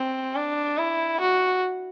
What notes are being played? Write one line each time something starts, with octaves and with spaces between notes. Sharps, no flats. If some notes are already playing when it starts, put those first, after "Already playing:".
Already playing: C4
D4
E4
F#4